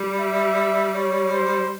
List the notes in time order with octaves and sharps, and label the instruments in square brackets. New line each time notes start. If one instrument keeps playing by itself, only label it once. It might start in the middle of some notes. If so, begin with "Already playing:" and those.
Already playing: [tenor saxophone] G3
[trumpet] E5
C#5
C5